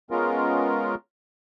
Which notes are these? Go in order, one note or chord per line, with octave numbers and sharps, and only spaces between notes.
G#3 B3 C#4 F4 A#4